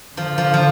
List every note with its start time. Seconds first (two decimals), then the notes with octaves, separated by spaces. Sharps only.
0.16 D3 F3
0.38 F3
0.54 F3